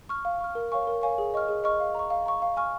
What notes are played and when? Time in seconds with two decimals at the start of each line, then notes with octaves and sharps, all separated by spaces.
0.09 C#6 F6
0.25 F5
0.41 C#6 F6
0.55 A#4
0.72 C#5 F5 G#5 C#6
0.87 A#4
1.02 C#5 F5 G#5 C#6
1.18 G#4
1.34 D#5 C#6 F6
1.49 G#4
1.64 D#5 C#6 F6
1.80 F5
1.95 A#5 C#6
2.10 F5
2.26 A#5 C#6
2.42 F5
2.57 G#5 C#6 F6